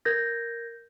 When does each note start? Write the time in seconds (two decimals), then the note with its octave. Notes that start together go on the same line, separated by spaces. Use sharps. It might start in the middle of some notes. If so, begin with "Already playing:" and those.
0.05 A#4 G6 G#6 A#6